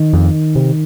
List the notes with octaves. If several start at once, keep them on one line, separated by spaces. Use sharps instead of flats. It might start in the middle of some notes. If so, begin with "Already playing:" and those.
Already playing: D#3
F2
C3